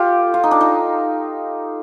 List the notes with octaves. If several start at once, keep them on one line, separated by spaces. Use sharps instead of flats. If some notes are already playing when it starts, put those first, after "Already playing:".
Already playing: F4 G4 A4
F4
D#4
D4
D#4